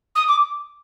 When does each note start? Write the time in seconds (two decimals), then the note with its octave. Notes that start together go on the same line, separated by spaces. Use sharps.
0.15 D#6
0.28 D6